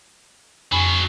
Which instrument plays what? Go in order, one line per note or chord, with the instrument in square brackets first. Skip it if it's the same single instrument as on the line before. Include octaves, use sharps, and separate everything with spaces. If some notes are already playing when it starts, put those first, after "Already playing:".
[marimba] F2 G#5 B5 [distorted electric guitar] C#3 F#3